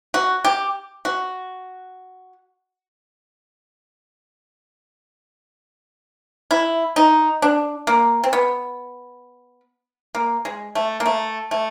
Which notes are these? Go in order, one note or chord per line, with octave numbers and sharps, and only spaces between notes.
F#4
G4
F#4
E4
D#4
D4
A#3
C4
B3
A#3
G#3
A3
A#3
A3
A3